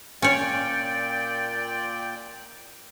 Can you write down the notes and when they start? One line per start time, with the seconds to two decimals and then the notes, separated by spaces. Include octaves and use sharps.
0.22 A#2 C#4 C#5 D5 G5